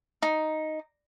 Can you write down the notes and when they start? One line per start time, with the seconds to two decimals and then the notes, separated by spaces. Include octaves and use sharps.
0.22 D#4